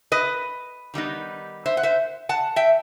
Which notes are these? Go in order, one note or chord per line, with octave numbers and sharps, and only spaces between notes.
B4 D#5
D#3 G3 B3 D#4
C5 E5
F#5
C5 E5
F#5 A5
E5 G5